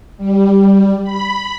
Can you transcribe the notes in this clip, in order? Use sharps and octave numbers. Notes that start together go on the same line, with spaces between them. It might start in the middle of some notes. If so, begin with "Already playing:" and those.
G3
B5